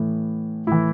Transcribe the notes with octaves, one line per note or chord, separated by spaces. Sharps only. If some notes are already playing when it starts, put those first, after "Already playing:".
Already playing: A2 E3
A2 E3 E4